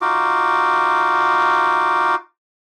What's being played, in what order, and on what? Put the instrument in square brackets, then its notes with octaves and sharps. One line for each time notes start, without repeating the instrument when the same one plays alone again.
[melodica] D#4 F4 F#4 D6